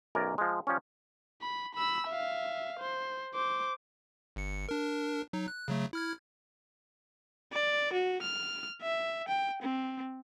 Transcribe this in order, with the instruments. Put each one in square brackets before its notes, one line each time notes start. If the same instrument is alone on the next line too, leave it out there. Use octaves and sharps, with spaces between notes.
[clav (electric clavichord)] B1 F#2 A#4 D5 G#5
F3 G#3
F3 G3 C#4
[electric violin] B5
B5 E6
E5 F5
C5
C5 D6
[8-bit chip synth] G1 C#7
D4 A#4
F#3 D#4
F#6
C#3 F#3 A3
E4 F6 G#6
[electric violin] D5
F#4
F6
E5
G5
C4